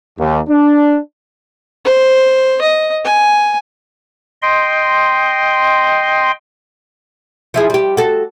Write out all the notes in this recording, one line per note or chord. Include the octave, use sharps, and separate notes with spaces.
D#2
D4
C5
D#5
G#5
D#5 G5 C6
F3 E4 G#4
G3 G4
F#4 A4